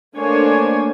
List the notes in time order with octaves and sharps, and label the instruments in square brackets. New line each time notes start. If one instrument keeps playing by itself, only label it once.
[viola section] A3 A#3 D4 C5 C#5 G#5